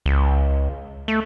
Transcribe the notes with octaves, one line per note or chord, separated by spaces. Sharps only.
C#2
A3